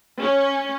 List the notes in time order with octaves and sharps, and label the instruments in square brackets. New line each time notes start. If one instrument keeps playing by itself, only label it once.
[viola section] C#4